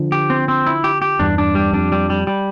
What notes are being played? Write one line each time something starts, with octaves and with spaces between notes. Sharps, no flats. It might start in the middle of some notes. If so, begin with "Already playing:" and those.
Already playing: D3 F3
G4
C4
C4
E4
G4
G4
E2 G2 D4
D4
G3
F2 D4
G3
G3
G3